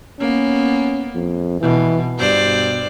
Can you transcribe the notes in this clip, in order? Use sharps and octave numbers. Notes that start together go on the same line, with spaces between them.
A#3 B3 C#4
F2
B2 E3
G2 B2 C5 D5